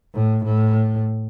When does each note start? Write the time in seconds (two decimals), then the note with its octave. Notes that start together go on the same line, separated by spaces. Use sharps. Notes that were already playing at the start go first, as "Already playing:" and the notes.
0.14 A2
0.44 A2